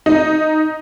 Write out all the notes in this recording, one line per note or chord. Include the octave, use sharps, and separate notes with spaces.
D#4